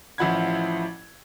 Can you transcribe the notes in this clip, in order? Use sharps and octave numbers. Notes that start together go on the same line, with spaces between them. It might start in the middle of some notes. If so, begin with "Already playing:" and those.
A1 F3 E4 F#5 B5 G#6